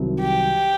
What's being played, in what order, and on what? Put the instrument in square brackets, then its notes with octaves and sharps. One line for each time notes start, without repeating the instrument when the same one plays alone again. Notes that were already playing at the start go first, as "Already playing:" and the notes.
Already playing: [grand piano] C2 C3 D#3 F#3
[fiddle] G4